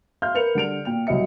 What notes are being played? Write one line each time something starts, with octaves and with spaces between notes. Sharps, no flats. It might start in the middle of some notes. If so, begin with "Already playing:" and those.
E5 F5 C6 F6 G6
A#4 B4 C#7 F7
D3 G3 D7 F7
A#2 G5 F7
C2 F#3 D#5 E5 C#7